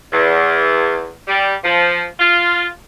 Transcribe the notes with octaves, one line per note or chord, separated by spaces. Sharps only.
E2
G3
F3
F4